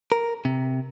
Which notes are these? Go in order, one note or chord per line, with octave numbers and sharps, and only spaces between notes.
A#4
C3